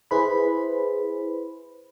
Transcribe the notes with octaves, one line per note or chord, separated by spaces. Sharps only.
E4 G#4 B4 C5 B5